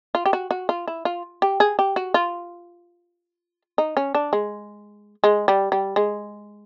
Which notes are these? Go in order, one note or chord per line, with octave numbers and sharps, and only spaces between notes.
F4
G4
F#4
F#4
F4
E4
F4
G4
G#4
G4
F#4
F4
D#4
C#4
D4
G#3
G#3
G3
G3
G#3